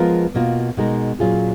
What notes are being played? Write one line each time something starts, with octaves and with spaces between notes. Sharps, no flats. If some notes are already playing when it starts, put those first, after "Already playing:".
Already playing: F3 G#3 B3 F4 A#4
B2 A#3 F4
B2 G#3 D#4 A#4
A#2 F#3 C#4 F4 G#4